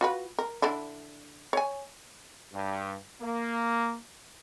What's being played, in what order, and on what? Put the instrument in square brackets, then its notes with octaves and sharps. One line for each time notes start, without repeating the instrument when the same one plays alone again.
[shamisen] F4 F#4 B4
A#4
D3 D4 E4
C#5 G#5
[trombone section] G2
A#3